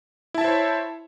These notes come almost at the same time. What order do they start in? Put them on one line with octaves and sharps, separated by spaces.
E4 A5 E5 C5 C#5